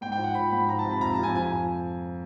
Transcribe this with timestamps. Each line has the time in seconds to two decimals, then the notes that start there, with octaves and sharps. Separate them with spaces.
0.01 G#2 G5
0.12 G5
0.17 F3
0.24 F#5
0.34 F3 B5
0.51 G#2 B5
0.68 F3 A#5
0.79 A5
0.85 C3
0.91 B5
1.01 F2 A#5
1.13 A5
1.19 F2 G#5
1.35 F3 G#5